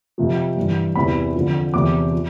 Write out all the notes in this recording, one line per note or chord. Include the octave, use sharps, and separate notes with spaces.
F2 C3 F3
G2 E3
E2 C3 E3 B5
F2 D3 F3
E2 C3 F3 D6
F3